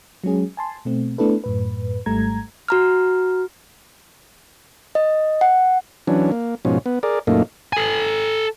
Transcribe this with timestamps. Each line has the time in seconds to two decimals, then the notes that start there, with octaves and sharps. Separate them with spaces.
0.24 F#3 G#3 C#4 G#4
0.57 G#5 A5 C6
0.85 B2 A3 C4
1.18 A3 B3 D4 E4 A4 B4
1.44 F#2 A2 B4
2.06 G#1 G#2 G3 A3 A#5 G#6
2.68 F#4 A#5 F6
4.95 D#5
5.41 F#5
6.07 E3 F#3 C#4 D4
6.32 A#3
6.65 G#2 B2 F3 C#4
6.86 B3
7.03 G#4 A#4 D5
7.27 F#2 A#2 A3 A#3 D#4
7.73 A4 G#5